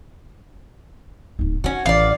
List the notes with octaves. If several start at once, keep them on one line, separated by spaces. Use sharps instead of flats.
D1 D#4
D#3 C#4 F#4
A1 B3 D5 F5